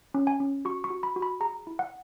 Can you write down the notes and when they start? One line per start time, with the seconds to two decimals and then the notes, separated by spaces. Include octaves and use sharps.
0.14 C#4
0.27 G#5
0.40 C#4
0.65 F#4 C#6
0.84 C#6
0.90 F#4
1.03 B5
1.16 F#4
1.22 B5
1.40 G#4 A#5
1.67 E4
1.79 F#5